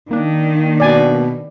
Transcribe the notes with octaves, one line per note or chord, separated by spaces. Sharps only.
D#3 A#3 D4
B2 D5 G#5